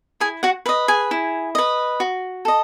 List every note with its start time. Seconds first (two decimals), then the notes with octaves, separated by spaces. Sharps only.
0.20 E4 G#4 G#5
0.43 F#4 F#5
0.66 B4 E5
0.69 D#5
0.88 G#4 G#5
1.11 E4
1.55 B4 D#5
2.00 F#4
2.45 A4 D#5